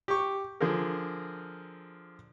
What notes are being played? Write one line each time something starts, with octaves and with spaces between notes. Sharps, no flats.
G4 C#6
D3 F3 G#4 A#4